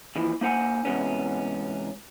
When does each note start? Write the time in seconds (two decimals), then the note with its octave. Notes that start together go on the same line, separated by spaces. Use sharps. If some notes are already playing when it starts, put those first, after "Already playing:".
0.16 D#2 E3 F3
0.41 A#3 D#4 C5 F#5 G#5
0.85 E2 G#2 C3 B3 C#4